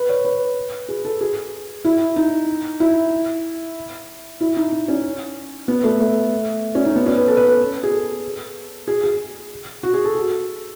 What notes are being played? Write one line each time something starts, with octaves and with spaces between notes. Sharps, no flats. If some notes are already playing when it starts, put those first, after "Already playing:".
Already playing: B4
C#5
B4
G#4
A4
G#4
E4
D#4
E4
E4
D#4
D#4
C#4
B3
A3
A3
C#4
D#4
B3
C#4
B4
A4
B4
A4
G#4
A4
G#4
G#4
F#4
G#4
A4
A4